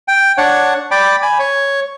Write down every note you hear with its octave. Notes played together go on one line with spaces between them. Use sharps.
G5
D4 C#5 F#5
D5 G5 B5 D6
G#5 B5
C#5